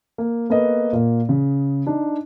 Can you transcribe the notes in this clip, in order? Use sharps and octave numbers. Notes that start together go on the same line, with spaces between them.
A#3
A#3 B3 A4 B4 D#5
A#2 A#3
C#3
D4 D#4